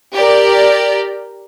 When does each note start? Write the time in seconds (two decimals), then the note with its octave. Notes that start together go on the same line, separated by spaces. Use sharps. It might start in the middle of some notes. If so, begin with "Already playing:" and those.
0.14 G4 A#4 D5